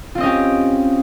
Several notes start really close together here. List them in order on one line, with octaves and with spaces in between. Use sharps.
F4 C4 D#5 C#4 G4